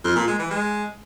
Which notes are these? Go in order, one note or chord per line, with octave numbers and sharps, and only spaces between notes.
F2
A#2
G#3
E3
G#3